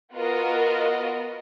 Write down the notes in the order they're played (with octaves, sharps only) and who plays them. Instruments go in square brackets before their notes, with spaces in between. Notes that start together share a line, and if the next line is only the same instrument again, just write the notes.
[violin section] B3 F4 F#4 A#4 D#5